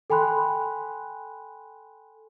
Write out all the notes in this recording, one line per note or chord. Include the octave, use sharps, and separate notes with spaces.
A4 G5 G#5 B5 C6 F#6